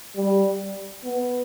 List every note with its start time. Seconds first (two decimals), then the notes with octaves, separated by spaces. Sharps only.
0.16 G3
1.05 B3